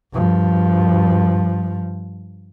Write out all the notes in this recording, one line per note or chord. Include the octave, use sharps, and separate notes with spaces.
G2 F3